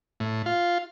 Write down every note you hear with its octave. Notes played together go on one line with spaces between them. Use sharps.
A2
F4